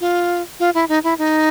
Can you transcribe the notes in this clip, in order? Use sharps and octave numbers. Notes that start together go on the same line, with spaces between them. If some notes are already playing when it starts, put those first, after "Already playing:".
F4
F4
E4
D#4
E4
D#4